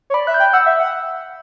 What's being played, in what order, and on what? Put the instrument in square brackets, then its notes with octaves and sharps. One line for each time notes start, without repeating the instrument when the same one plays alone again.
[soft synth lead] C#5
[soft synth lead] D5 [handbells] B5
[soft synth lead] E5 [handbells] F#6
[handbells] G6
[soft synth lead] G5
[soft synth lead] F#5 [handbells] E6
[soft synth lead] E5
F#5